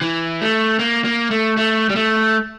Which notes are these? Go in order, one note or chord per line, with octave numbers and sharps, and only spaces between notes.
E3
A3
A#3
A#3
A3
A3
G3
A3